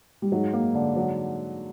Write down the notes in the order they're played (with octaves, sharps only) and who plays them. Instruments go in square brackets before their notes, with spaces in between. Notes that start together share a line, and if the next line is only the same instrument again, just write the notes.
[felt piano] G3
[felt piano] G#2 G#3 [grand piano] F#3
[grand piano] A#3
D3
F#3